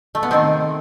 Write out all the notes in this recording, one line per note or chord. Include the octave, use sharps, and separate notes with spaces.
A3
B3
C3 D#3 A3 C4